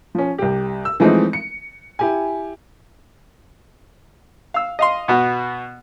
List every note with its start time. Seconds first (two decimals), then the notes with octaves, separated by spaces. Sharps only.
0.15 F3 C#4
0.38 C2 G4
0.85 E6
1.00 E3 F3 G#3 A3 C4 D#4
1.33 C#7
1.99 E4 G4 G#5
4.54 F5 E6
4.79 D#5 F5 C6
5.08 B2 B3 F#4